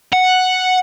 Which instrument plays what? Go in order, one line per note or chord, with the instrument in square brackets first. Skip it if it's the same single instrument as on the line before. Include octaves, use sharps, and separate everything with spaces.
[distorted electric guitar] F#5